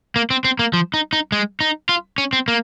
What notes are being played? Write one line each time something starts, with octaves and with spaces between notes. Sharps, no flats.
A#3
C4
C4
A#3
F3
D#4
D#4
G#3
D#4
F4
C#4
C4
A#3